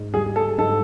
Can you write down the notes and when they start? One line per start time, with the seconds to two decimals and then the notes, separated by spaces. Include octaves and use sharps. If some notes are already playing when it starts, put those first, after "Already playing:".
Already playing: G#2
0.14 G3 G#4
0.36 A4
0.58 G#2 A4